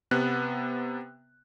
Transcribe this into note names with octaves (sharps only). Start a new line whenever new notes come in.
C3 B3 F#6